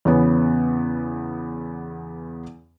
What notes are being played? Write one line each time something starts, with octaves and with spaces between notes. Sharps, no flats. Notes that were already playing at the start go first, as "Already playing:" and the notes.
E2 C#3 B3